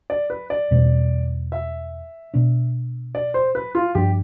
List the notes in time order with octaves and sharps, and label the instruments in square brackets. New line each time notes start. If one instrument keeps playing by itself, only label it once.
[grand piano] D5
B4
D5
[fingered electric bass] E2 B2 G3 C4
[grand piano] E5
[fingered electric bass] B2 B3 D4
[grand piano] D5
C5
B4
F4
[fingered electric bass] G2 F3 B3 D4 [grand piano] G4